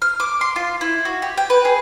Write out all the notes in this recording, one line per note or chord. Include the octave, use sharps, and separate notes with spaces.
F6
D6
C6
F4
E4
F#4
G4
G5
B4
G#4